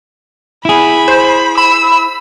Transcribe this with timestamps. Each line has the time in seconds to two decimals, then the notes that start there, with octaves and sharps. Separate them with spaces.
0.65 E4 G#4 B5
1.08 C5
1.58 B5 E6